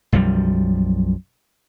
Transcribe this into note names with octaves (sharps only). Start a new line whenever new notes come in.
B1 F#2 F3 G3